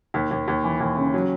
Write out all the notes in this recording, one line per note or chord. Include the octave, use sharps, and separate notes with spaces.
D#2
D#2
D#2
E3
D#2
C#3
F#3